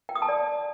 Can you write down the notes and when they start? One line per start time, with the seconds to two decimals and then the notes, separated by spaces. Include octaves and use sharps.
0.09 G5
0.15 D#6
0.22 A5
0.28 D5